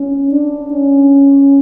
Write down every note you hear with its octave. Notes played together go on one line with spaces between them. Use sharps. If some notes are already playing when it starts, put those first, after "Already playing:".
Already playing: C#4
D4
C#4